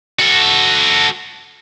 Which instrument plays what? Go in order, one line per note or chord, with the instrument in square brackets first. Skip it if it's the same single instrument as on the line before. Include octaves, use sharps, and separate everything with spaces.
[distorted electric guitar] F#4 A4